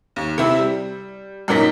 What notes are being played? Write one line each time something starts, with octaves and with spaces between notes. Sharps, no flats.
D#2
C3 C4 E4 E5
G3
F#2 A#2 F#3 A#3 D#4 B6